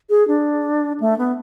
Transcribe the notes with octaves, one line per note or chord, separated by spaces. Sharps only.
G#4
D4
A3
B3